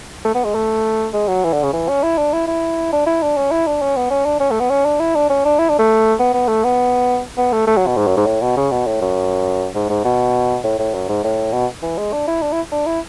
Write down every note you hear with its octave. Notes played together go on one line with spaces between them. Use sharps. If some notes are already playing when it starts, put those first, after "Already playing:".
A3
B3
G#3
A3
G#3
F#3
E3
D3
C#3
E3
C#4
E4
D4
E4
E4
D4
E4
D4
C#4
E4
D4
C#4
B3
C#4
D4
C#4
A3
B3
C#4
D4
E4
D4
C#4
D4
E4
D4
A3
B3
B3
A3
B3
B3
A3
A3
F#3
B2
G#2
F#2
G#2
A2
B2
C#3
B2
A2
F#2
G#2
G#2
B2
A2
A2
F#2
G#2
A2
B2
E3
G#3
D4
E4
D4
E4
D4
E4